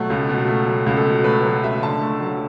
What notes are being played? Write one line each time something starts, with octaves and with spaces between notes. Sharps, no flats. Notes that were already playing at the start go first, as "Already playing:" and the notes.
Already playing: B2 F#3 A3
C#2
B2
A3
F#3
C#2
A4
B2
A3 B4
F#3
C#2 E5
D3 A5
A3
F#3